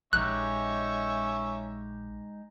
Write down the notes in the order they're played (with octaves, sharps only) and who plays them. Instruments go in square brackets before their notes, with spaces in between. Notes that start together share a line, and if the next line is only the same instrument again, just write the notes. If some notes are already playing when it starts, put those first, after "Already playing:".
[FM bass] A#1 [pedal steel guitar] G#3 D#4 G4 [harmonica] C#4 E5 C#6 [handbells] F#6